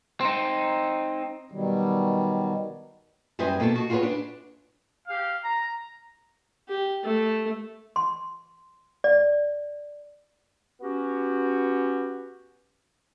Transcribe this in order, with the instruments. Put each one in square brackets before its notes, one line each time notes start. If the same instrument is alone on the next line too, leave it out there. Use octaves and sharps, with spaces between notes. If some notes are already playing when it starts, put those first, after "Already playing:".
[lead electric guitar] C4 D#4
[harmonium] B2 D#3 F#3 G3
[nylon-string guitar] F#2 G3 B4 C5 D#5 G#5
B2 A#3 A4 C#5 A5
F#4
F4 F#4 G#4 A4 B4 C#5
D4
[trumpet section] G4 F5
A#5
[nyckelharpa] G4
A3
[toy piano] C6
D5
[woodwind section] B3 C#4 F#4 G4